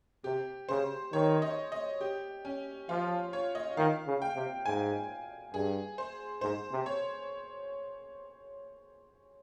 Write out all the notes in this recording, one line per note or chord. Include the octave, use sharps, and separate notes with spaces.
C3 G4
C#3 C5
D#3 C#5
D#5
D#5
G4
C#4
F3 F4
C#5
D#5
D#3 F5
C#3
G5
C3
G#2 G#5
G2 G#4
C5
G#2 C5
C3
C#5